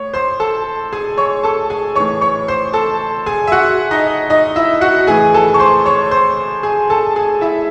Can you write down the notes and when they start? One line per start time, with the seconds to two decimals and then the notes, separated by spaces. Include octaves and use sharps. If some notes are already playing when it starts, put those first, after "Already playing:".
Already playing: A2 C#5
0.14 C5 C6
0.40 A4 A5
0.93 G#4 G#5
1.17 C#5 C#6
1.43 A4 A5
1.70 G#4 G#5
1.95 A2 E3 C#5 C#6
2.21 C#5 C#6
2.48 C5 C6
2.73 A4 A5
3.26 G#4 G#5
3.47 E5
3.52 F#4 F#5
3.91 D#4 D#5
4.30 D#4 D#5
4.56 E4 E5
4.81 F#4 F#5
5.07 A2 E3 G#4 G#5
5.34 A4 A5
5.54 C#6
5.60 C5 C6
5.86 C#5 C#6
6.11 C5 C6
6.63 G#4 G#5
6.90 A4 A5
7.16 G#4 G#5
7.41 E4 E5